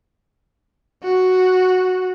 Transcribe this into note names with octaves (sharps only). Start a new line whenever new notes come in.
F#4